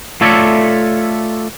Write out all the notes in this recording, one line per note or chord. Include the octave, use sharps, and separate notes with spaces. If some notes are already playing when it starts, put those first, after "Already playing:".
A3 F4 A4 C#5 D5 E5